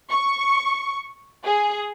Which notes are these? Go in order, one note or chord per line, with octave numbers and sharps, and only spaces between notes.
C#6
G#4